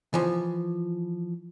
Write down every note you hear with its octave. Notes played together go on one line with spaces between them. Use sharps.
E3 F3